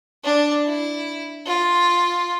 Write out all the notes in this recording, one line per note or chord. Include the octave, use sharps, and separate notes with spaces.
D4
E4
F4